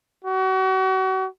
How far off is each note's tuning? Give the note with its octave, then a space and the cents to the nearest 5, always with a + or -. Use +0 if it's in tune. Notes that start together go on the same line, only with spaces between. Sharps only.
F#4 +35